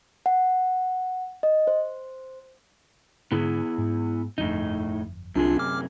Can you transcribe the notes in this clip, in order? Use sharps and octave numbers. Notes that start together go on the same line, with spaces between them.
F#5
D#5
C5
G#2 D3 B3 E4 G#4
G#2
G1 F2 A2 D4 D#4
C2 F#2 C3 D4 F4 G#4
D6 F6